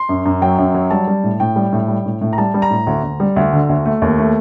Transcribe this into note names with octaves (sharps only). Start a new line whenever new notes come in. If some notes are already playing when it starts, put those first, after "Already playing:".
Already playing: C6
F#2
F#2
F#3 G5
F#2
F#3
G3 A5
G3
A2
A2 G5
G3
A2
G3
A2
A2
A#5
G3 A5
G3
A#5
A2
D2
D2
G3
D2
D3
D2
A3
D#2
A3